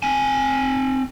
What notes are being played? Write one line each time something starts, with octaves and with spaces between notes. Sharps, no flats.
C4 G#5